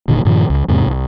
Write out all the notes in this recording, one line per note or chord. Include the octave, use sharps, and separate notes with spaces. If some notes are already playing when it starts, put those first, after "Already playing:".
E1 A#2 D3 D#3
G2 A#2 D#3 F3
C#2
E2 G#2 C3
C2